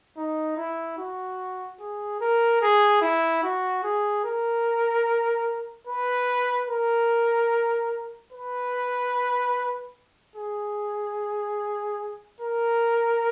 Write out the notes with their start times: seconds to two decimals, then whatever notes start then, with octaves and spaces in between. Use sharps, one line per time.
0.17 D#4
0.57 E4
0.98 F#4
1.80 G#4
2.21 A#4
2.62 G#4
3.02 E4
3.43 F#4
3.83 G#4
4.24 A#4
5.87 B4
6.69 A#4
8.33 B4
10.36 G#4
12.41 A#4